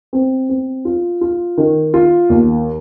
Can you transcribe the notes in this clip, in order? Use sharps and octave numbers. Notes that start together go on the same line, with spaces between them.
C4
C4
F4
F4
D#3
F4
D#2